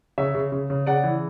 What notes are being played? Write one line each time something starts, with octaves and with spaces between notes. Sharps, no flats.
C#3 C#5 E5
C#3
C#3
C#3
C#3 D5 F#5
E3